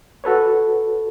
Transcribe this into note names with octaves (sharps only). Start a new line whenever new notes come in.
F#4 A4 B4 C#5